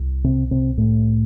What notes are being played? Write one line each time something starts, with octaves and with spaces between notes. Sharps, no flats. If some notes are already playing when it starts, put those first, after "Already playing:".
Already playing: C2
C3 C4
C3 C4
A2 A3